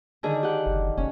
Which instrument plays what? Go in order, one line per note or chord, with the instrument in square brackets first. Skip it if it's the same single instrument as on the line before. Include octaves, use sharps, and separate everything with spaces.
[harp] D3 D#3 G#4
G4 F#5
[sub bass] F#1
[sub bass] F1 [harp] C#4